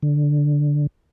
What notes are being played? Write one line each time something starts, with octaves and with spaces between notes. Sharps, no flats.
D3